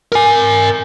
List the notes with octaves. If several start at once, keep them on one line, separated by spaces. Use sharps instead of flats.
A#4 G#5